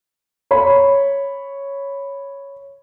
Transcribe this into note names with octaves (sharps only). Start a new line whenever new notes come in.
C#5 B5